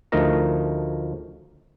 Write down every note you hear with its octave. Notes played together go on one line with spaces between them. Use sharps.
D2 F3 A3 D#4 A#4 A#5